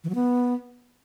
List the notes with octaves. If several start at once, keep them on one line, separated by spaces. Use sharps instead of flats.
E3
F#3
B3